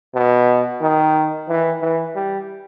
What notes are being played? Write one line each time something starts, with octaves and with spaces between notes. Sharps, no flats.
B2
D#3
E3
E3
G3